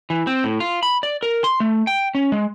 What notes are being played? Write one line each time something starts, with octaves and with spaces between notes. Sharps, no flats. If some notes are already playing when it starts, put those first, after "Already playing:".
E3
C4
A2
F4
B5
D5
A#4
C6
A3
G5
C#4
G#3